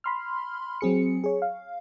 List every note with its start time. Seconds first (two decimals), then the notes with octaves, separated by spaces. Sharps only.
0.04 B5 C6 F6
0.81 F#3 C4 G#4 C#7
1.24 G#4 C#5
1.42 F5